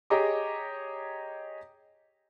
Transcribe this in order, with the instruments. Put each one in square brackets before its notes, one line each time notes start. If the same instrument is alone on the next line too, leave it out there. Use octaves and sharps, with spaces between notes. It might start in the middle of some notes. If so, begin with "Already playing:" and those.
[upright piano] G4 G#4 C#5 D#5 A#5 D6